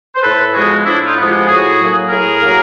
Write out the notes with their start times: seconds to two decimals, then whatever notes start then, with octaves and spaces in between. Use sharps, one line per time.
0.15 C5
0.22 A2 A4 B4
0.54 F3 G#3 B3 F#4 G#4
0.85 A2 D4 E4
1.06 D#4 F4
1.16 F3 G#3 B3
1.27 F4 G4
1.47 A2 F#4 G#4
1.79 F#3 A#3
2.09 A2 G#4 A#4
2.41 F#3 A#3